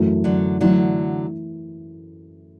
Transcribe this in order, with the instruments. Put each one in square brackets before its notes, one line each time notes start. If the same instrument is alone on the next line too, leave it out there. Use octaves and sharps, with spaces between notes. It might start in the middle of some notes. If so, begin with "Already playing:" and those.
Already playing: [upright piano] F#2 E3 A3 F#4
[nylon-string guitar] D3 F#3
[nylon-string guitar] D3 F#3 [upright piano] E3 A3 E4